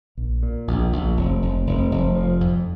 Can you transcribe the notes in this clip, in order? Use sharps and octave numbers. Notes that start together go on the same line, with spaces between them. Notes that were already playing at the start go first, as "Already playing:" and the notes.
A#1
A#2
A#1
A#1
F1
F1
F1
F1
F3
F2